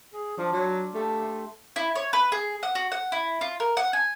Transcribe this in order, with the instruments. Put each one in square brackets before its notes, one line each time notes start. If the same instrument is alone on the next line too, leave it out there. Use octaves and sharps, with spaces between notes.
[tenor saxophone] G#4
[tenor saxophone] F3 [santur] D4 F4
[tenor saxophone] F#3
[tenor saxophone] A3 [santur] G4 A4 F5
[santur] E5 C6
[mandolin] E4
C#5
B4
G#4
F#5
F#4
F#5
E4
F4
A#4
F#5
G#5